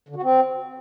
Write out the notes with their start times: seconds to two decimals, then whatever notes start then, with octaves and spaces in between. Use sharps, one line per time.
0.09 D3
0.16 F#4
0.23 C4